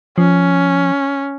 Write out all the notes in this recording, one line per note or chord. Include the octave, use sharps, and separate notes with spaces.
F3 C#4